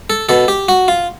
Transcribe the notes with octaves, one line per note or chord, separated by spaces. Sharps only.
A4
B2 A4
G4
F#4
F4